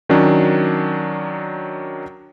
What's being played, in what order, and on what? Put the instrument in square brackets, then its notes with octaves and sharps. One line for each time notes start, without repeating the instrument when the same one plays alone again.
[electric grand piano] D#3 F#3 C#4 D4